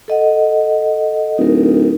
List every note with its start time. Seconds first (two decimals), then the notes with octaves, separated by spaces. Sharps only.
0.08 A4 D#5 F#5
1.38 D1 D#4 A#4